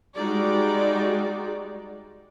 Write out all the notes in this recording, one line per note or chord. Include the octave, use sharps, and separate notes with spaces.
G3 G#3 D#4 F#4 D5